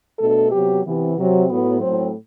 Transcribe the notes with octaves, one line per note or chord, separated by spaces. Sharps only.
B2 A3 D4 A4
C3 F#3 B3 G4
C3 E3 B3
C3 F#3 C4
A2 F#3 B3
A2 F#3 C4